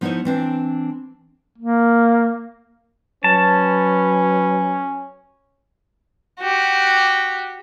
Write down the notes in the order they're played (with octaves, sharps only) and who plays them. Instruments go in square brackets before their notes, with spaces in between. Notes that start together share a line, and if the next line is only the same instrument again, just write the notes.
[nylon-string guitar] F3 B3 D#4 E4 C5 C#5
E3 C4 D4
[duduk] A#3
[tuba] F#3 [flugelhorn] C#4 [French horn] B4 [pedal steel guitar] A5
[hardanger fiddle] F#4 G4